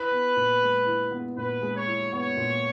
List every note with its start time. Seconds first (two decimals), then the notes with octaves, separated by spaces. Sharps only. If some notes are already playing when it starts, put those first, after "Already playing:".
Already playing: E4 B4
0.11 B3
0.37 A#2
0.62 G#3
0.86 E4
1.11 B3
1.37 A#2 B4
1.61 G#3
1.75 C#5
1.87 E4
2.12 B3 C#5
2.37 A#2